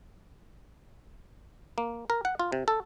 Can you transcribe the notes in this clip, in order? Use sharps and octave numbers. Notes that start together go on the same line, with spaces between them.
A#3
A#4
F#5
F4
C3
A4